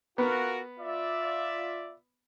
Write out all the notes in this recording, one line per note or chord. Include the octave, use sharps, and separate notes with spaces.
B3 F4 F#4 A#4
F4 D5 E5